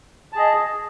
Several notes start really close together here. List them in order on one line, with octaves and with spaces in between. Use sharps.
A5 G#4 D#5